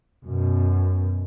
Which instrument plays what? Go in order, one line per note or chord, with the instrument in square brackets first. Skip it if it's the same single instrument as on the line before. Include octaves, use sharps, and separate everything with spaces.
[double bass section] F#2 B2